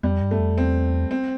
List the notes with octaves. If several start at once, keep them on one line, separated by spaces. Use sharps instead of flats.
F2 G3
G2
A3
F2
E2 C4
C4